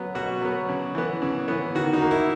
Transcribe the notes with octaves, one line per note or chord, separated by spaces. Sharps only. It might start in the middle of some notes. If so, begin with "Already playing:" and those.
Already playing: F#3 B3
B2 F#4
F#3 B3
C#3
E3 B3
C#3
E3 B3
D#3 F#4
D#4
A#3
E4